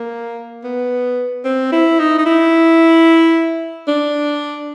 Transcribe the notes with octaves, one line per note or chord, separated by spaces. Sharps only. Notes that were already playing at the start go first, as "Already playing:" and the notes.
Already playing: A#3
B3
C4
E4
D#4
D#4
E4
D4